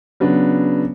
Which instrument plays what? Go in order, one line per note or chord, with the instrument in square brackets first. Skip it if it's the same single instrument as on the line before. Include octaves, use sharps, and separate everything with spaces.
[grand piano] C#3 F#3 B3 D4